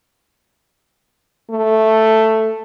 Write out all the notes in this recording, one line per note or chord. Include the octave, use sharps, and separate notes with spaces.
A3